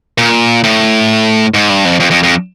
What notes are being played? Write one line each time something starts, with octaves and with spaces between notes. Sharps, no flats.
A#2
A2
G#2
G2
F2
F2
F2
F2